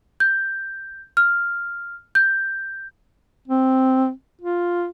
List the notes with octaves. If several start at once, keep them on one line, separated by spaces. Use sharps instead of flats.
G6
F6
G6
C4
F4